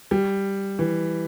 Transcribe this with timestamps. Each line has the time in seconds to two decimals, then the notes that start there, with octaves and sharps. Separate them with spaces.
0.11 G3
0.79 E3